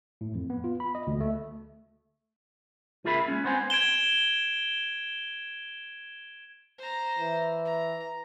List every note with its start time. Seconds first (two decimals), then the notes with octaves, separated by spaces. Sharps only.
0.21 A2
0.35 F2
0.50 B3
0.64 F4
0.80 B5
0.95 D#5
1.07 D2
1.20 A3
3.05 C#2 F4 G#4 A#4 E5 B5
3.28 G#3 A#3 C#4
3.44 B3 C4 C5 F#5 G#5
3.70 G#6 D7 E7 G7
6.78 C5 A#5
7.19 E3
7.65 A#5